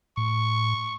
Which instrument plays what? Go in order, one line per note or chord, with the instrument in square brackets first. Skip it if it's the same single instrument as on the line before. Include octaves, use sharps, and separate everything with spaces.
[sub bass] A2 [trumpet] C#6